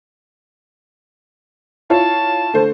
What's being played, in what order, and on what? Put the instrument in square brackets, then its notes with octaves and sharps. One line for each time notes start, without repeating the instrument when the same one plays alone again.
[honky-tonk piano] E4 F4 C#5 [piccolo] A5
[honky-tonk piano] D3 A3 C5